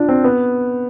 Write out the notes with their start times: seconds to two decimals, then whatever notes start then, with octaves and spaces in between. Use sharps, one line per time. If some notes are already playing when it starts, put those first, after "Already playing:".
Already playing: D4 F4
0.09 C4
0.24 B3